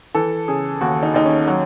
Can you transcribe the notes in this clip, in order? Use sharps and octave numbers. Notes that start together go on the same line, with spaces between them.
E3 A4
C#3 G#4
D#2 F#4
D#4
D#2 D#4
C#4
F#3